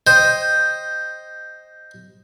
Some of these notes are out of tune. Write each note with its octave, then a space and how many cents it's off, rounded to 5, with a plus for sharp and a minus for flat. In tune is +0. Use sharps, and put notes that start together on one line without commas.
C5 +0 D#5 +0 G5 +0